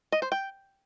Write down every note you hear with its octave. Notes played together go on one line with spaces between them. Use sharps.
D#5
C5
G5